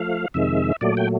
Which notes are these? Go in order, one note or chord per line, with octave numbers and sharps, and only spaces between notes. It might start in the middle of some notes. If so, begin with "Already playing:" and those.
Already playing: F3 A3 F5
F2 C3 D#3 G#3 E5
A#2 F#3 A3 D5
G5